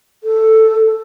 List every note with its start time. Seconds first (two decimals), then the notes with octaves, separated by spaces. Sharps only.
0.24 A4